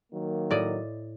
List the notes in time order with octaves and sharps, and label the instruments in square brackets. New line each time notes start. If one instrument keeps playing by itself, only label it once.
[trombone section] D#3 F#3 A#3
[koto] A2 D5 D#5